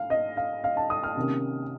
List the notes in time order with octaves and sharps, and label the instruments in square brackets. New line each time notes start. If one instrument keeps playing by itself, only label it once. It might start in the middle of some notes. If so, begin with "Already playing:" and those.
Already playing: [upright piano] F5
D#5
F5
F5
A5
D#6
F6
C3 D#3 A#3 C#4